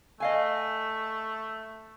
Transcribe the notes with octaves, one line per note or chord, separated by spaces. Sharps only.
A3 D#5 F5 G#5